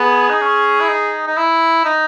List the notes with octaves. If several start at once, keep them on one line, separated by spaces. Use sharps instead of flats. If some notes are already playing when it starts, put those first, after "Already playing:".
Already playing: B3 G#4
D#4
C#4
E4
D#4
D#4
E4
D#4